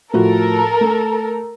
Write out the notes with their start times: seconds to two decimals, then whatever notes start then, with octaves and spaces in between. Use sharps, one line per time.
0.13 A2 F3 F#4 A4 A#4
0.81 A3